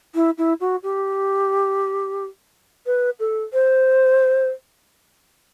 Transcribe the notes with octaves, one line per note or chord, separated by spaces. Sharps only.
E4
E4
F#4
G4
B4
A4
C5